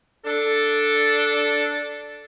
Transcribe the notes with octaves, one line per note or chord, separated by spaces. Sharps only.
D4 A4